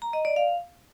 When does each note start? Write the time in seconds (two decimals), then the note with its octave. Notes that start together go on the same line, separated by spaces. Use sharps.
0.02 A#5
0.13 D#5
0.25 D5
0.36 F5